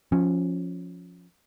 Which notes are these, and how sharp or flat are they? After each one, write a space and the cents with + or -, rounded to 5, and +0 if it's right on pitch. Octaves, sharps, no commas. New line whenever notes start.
F3 +15 C#4 +0